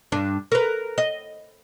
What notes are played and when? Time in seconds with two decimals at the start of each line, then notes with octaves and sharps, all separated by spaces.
0.12 G2 D4
0.52 A#4 B4
0.98 D#5